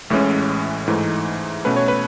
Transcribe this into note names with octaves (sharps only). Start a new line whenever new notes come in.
A1 A2 E3 G#3 C#4
G#2 E3 A3 D#4
B2 A3 C#4 B4
C#5
B4